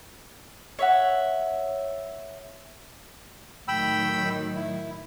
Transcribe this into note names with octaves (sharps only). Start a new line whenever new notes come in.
C#5 E5 F#5
A2 D#3 F#3 G5 B5 E6
E4